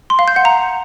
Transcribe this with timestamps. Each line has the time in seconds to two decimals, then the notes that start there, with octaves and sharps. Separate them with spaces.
0.10 C6
0.19 F5
0.28 G6
0.36 F#5
0.45 A#5